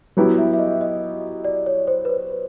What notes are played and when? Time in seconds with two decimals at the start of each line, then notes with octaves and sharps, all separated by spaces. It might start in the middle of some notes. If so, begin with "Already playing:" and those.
0.17 F#3 B3 E4 G4
0.38 E5
0.53 E5
0.59 D#5
0.81 D#5
1.44 D5
1.66 C#5
1.87 C5
2.05 B4
2.09 C5